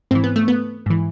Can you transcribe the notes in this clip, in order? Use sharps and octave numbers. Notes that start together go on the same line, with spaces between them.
G#2 E3 C4
B3
A3
B3
G#2 E3